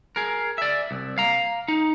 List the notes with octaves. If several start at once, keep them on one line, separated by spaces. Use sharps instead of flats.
G#4 A#4
D5 E5
C2
F5 A#5
D#4